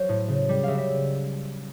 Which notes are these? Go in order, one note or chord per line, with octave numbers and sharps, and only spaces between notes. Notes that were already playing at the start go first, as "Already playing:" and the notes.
Already playing: F#3 C5
A2
C#3
G3
C#3 E5 F5
E5